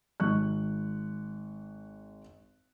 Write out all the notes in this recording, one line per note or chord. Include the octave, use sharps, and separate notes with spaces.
G#1 C#6 F#6